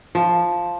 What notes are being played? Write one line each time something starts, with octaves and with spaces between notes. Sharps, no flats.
F3